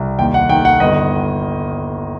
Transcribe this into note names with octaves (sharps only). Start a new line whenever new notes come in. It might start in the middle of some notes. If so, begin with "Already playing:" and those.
Already playing: C2
D#2 G5
F#5
D#3 G5
F#5
G1 D#5